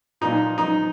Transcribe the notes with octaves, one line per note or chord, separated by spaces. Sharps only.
A#2 F3 D#4
D#4